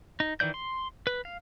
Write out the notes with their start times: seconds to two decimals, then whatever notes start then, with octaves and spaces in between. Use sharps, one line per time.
0.20 D#4
0.40 D#3 E3 D5 G6
0.54 C6
1.07 B4
1.25 F5